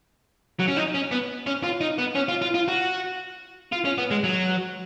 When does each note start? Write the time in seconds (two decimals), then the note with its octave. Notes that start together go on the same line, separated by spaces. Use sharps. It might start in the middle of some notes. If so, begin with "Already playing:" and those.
0.59 F#3
0.68 C#4
0.77 D#4
0.94 C#4
1.11 B3
1.46 C#4
1.63 F4
1.81 D#4
1.99 B3
2.15 C#4
2.29 F4
2.42 F4
2.54 F4
2.68 F#4
3.72 F4
3.85 C#4
3.98 B3
4.11 G#3
4.24 F#3